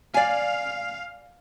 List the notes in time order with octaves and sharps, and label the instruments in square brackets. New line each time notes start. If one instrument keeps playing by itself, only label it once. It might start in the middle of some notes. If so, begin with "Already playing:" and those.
[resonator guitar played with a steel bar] D5 G#5 [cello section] F5